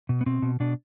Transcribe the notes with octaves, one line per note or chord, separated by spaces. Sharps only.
B2
B3
B2 C4
B2
B2 D4